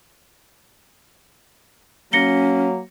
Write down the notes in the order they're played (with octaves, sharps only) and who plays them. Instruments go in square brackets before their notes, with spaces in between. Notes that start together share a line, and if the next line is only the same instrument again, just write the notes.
[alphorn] F#3 [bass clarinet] A#3 [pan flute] C#4 [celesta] A#6 C#7 G7